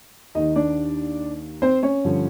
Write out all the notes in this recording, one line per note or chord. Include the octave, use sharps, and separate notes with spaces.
D#2 D#3 D#4 D#5
D4 D5
C4 C5
C#4 C#5
G2 D3 F3